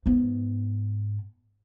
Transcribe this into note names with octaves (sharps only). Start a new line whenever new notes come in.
G#2 B3